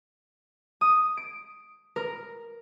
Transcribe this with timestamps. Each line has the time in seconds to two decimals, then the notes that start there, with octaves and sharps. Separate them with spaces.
0.81 D#6
1.17 D7
1.96 A#4